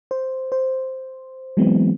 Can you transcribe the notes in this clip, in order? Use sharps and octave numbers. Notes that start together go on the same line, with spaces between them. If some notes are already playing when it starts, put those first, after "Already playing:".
C5
C5
E3 F#3 G#3 B3 C4